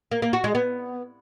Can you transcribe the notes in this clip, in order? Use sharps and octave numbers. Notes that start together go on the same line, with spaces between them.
A#3
A#3
F#4
G#3
B3